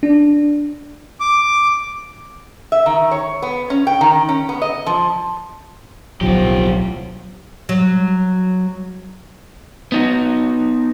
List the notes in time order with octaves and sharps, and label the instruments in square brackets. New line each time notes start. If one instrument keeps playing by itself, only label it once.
[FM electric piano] D4
[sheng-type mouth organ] D6
[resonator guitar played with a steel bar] E5
D#3
C#5
B3
C#4
G5
D#3
C#4
B3
D#5
F3
[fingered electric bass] D1 B1 [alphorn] F3 [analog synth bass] F#3 [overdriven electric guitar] F4 G4
[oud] F#3
[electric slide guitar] B3 D#4 F#4